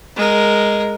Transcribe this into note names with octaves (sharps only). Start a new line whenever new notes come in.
G#3 A#4